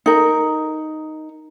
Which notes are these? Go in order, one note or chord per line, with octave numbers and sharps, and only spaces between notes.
D#4 A#4